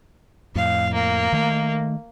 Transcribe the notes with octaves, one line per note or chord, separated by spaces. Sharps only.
F2 A2 F5
A#3
D#3 A3